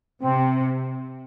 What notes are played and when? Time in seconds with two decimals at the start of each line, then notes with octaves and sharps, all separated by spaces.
0.23 C3 C4